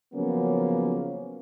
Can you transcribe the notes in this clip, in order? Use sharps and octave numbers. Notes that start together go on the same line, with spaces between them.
C#3 F3 F#3 A#3 B3 C#4